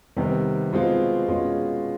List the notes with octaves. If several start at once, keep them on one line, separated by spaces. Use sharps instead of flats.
C3 D#3 G3 B3
B2 G#3 C4 F4
B2 G#3 C#4 F4